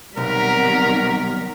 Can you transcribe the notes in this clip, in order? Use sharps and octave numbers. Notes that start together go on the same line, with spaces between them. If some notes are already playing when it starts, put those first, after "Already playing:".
B1 C3 D#3 G3 A#4 F#5 A#5 B6